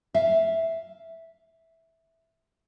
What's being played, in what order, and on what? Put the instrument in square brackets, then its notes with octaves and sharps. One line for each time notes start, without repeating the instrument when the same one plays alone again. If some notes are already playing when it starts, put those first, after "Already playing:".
[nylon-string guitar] E5 F5